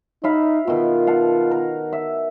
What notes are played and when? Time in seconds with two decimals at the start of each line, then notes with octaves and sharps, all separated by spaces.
0.24 D#4 E5 F5 B5
0.68 B2 D#3 F4
1.07 F5 F#5 A5
1.51 A#4
1.93 E5